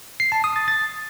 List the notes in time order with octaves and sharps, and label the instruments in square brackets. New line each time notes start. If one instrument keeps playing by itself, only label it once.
[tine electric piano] C7
A5
D#6
A6
A6